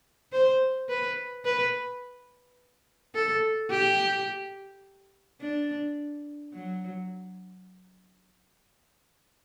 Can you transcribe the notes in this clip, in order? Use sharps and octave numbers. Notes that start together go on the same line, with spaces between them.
C5
B4
B4
A4
G4
D4
F#3